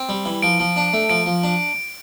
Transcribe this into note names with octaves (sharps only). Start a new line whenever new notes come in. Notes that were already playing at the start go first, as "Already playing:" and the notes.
Already playing: C4
G3
E3
F3 D7
F3
D4
A3
F3 D7
F3
D4